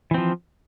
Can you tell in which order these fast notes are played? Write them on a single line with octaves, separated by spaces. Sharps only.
E3 C4 F3